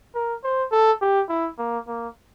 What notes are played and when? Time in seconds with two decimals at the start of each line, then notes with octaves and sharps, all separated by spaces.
0.15 A#4
0.44 C5
0.72 A4
1.02 G4
1.29 E4
1.59 A#3
1.88 A#3